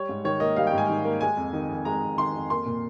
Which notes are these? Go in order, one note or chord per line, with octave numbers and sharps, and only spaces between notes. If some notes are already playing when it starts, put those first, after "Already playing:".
Already playing: G3 C#5
G#2
D#3 C#5
A#3 D#5
G3 F5
G5
G#2 G#5
D#3
A#3
G#3 G#5
F2
D#3
F2
G#3 A#5
F2
D#3 C6
F2
A#3 C6
A#2